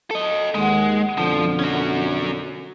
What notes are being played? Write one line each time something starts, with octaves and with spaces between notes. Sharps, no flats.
A4 D#5
D#2 G#3 F#5
F2 B2 D3 F3
C#4 F#4